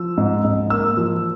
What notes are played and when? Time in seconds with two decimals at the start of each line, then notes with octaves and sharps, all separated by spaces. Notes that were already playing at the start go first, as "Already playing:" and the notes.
Already playing: F3 E6
0.17 G#2
0.44 G#2
0.70 A#3 E6
0.97 F3